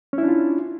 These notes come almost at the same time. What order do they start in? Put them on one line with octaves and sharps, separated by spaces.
C#4 E4 D4 F4